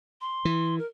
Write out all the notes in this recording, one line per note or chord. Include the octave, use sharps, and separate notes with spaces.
C6
E3
A#4